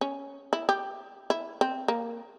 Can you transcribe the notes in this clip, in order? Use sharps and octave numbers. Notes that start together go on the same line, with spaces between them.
C#4
E4
G4
E4
C4
A#3